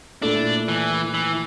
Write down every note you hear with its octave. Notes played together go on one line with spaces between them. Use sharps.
A#2 A3 D4 E4 A4
E3
E3